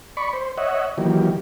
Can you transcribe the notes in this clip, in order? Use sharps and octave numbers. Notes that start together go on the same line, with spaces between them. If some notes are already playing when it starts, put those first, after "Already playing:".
D5 B5 C#6
C5
C#5 D#5 E5 F#5
D#3 E3 F#3 A#3 G4